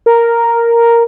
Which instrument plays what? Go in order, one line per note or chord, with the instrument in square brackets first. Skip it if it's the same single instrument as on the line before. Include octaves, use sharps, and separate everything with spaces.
[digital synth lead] A#4